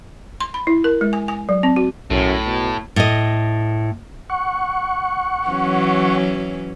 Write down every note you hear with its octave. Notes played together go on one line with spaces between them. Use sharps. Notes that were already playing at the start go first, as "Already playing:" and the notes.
C6
B5
E4
A#4
G#3
G#5
G#5
F#3
C4
F#4
B1 F#2 A2
B2
A2 D#5
F#5 C#6
E3 F#3 C#4